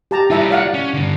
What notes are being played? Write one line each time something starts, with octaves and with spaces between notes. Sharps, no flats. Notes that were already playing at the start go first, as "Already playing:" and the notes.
G4 A5 A#5
G3 E4 F4 E5 A#5
D5 F5 F#5
C#4
G2 D3